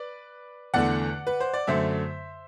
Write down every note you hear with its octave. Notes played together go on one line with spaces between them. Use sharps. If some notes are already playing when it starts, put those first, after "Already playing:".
Already playing: B4 D5
E2 D3 A3 D5 F#5
B4
C5
D5
F#2 D3 A3 C5 E5